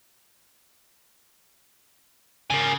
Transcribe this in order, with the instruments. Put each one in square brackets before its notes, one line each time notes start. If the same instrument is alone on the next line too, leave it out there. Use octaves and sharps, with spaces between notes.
[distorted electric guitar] C#3 [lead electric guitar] A#4 G#5